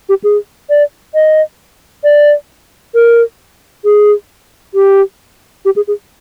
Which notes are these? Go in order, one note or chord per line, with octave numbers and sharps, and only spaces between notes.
G4
G#4
D5
D#5
D5
A#4
G#4
G4
G4
G#4
G#4